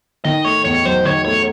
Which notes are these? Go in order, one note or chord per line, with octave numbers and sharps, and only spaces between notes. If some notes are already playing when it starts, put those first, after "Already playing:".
D#3 D#5
A3 C#5
E2 C#5
F#3 C5
D#3 C#5
A3 C#5